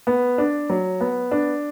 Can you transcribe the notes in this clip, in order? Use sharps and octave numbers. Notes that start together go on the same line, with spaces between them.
B3
D4
F#3
B3
D4